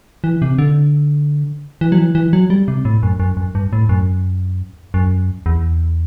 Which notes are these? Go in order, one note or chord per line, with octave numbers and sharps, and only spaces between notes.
E3
C3
D3
E3
F#3
E3
E3
F#3
G3
C3
A2
F#2
F#2
F#2
G2
A2
F#2
F#2
E2